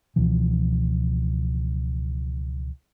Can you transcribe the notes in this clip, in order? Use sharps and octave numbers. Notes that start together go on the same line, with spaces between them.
C#2 B2 E3 F3